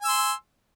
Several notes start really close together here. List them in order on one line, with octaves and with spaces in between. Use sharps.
G#5 E6 C6